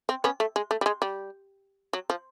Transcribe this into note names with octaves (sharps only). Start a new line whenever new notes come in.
C4
B3 C#4
A3
G#3
A3
G3
G#3
G3
F#3
F3